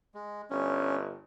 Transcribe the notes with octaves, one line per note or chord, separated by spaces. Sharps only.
G#3
G1 C#4